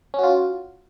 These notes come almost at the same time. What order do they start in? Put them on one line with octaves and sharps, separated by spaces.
C#4 F#4 F4